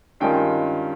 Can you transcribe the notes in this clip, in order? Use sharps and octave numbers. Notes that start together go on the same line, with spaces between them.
G2 D#3 G#3 C#4 F4 G5